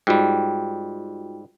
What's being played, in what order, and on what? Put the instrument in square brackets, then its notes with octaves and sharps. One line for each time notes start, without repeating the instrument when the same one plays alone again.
[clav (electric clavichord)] G#2 G3 [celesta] F4 F#4 G5